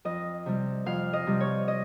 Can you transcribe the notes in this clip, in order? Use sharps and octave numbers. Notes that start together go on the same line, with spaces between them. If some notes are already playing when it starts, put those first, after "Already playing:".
F2 D#5
C3 G3
F2 F5
D#5
C3 G3
C#5
D#5